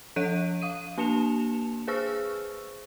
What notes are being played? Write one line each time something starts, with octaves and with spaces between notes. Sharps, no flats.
F3 A4 C#5 F#6 D7 D#7
F5 D#6 D#7
A#3 D4 A5 C#7 E7 F7
G#4 B4 C5 C#6 E6 F6